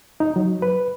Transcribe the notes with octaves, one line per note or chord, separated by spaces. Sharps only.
D#4
F#3
B4